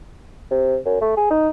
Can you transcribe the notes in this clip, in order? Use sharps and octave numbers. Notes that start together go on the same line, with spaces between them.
C3
F#2
A3
G#4
D#4